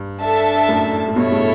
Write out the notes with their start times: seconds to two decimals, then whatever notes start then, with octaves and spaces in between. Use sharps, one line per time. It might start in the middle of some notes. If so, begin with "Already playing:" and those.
Already playing: G2
0.22 D4 A4 E5 A5
0.68 F#2 A2
1.08 A2
1.16 G2 B2 E4 A4 C#5 E5
1.32 A2 C#3